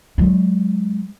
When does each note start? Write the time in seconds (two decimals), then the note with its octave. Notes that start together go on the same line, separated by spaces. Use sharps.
0.18 F#3 G#3